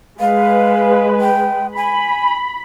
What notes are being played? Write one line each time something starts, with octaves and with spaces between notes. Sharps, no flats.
G#3 B4 F5
G5
G#5 B5